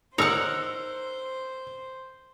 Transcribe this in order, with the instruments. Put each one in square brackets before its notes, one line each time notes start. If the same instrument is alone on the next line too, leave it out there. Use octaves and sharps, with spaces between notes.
[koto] D#4 C#5 [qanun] A#4 F#5 [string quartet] C5 [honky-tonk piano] E6 F7